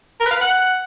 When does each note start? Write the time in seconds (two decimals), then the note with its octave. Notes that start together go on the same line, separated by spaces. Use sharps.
0.21 A#4
0.26 B4
0.31 F5
0.36 B4
0.41 F#5